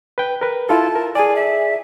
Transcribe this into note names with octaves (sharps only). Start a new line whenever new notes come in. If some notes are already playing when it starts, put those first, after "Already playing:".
B4 G5
A#4 B4
E4 F4 A4 A5
A#4
G#4 D5 G#5
E5